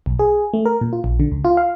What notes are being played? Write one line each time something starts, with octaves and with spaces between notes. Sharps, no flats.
B1
G#4
A3
A#4
A#2
F4
A#1
D3
C#2
F4
F5